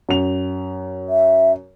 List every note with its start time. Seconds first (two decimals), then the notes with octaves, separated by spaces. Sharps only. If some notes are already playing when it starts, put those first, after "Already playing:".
0.09 F#2 F7
1.09 E5